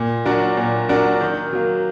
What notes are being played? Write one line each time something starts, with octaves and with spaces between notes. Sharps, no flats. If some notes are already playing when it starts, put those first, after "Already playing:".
Already playing: A#2
F#3 D4 F#4 A#4
A#2
F#3 D4 F#4 A#4
D#3
F#3 A#3